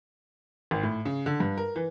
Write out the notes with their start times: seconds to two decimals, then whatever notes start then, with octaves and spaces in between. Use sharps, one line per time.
0.71 G#1
0.83 A2
1.05 C#3
1.26 D3
1.40 G2
1.58 A#4
1.76 E3